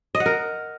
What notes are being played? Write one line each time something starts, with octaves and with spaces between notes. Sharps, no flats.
D#5
F#5
A#4